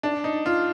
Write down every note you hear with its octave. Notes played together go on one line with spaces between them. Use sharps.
D4
D#4
F4